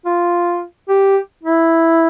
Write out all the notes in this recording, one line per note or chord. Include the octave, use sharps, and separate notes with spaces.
F4
G4
E4